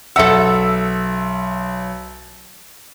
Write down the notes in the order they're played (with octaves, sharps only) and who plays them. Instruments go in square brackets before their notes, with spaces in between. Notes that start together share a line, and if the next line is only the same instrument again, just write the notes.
[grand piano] B1 E5 E6 [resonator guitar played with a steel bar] A4 F#5